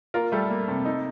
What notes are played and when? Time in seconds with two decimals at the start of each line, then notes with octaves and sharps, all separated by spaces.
0.14 A#3 F4 A#4
0.32 G3 A3 A4
0.50 A#3
0.68 C3
0.85 D#4